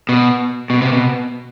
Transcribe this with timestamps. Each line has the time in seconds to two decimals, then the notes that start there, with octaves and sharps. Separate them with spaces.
0.09 B2
0.70 B2
0.82 C3
0.93 B2